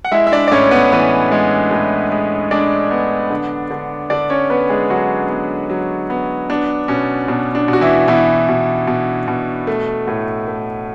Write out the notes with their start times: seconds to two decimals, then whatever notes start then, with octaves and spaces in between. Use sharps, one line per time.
0.05 F#5
0.12 G#3 E4 E5
0.27 E5
0.32 D4 D5
0.48 D5
0.51 A2 C#4 C#5
0.66 C#5
0.71 B3 B4
0.92 E3 B3 B4
1.32 G#3
1.71 A2
2.12 G#3
2.51 G#3 D4 D5
2.91 B3
3.30 D3
3.71 D3
4.10 D3 D4 D5
4.30 C#4 C#5
4.50 B3 B4
4.69 G#3 G#4
4.90 D3 F#3 F#4
5.29 B3
5.70 F#3
6.10 B3
6.50 B3 D4
6.88 B2 C#4
7.28 B2 D4
7.55 D4
7.68 B2
7.73 F#4
7.81 E3 E4
8.08 B2 E3 E4
8.48 B2
8.87 B2
9.28 B2
9.67 A3
10.08 A2
10.48 A3